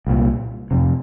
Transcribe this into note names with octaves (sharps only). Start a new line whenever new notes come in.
C2 A#2
F2 C3